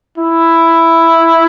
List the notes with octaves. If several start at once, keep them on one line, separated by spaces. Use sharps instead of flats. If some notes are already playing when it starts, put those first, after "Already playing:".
E4